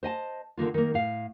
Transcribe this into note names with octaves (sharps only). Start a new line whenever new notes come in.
C5 D#5 G#5 A5
D3 D#3 A#3 F4
D#3 A#3
A2 F5